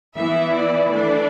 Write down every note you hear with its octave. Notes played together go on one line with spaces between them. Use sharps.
E3 B3 E4 E5
D5
E3 A3 D4 D5